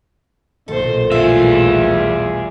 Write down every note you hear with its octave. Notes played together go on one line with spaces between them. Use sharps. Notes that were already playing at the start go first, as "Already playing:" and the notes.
B1 A#2 D#3 A#3 A4 C5
E2 G3 A3 F4 G#4 E5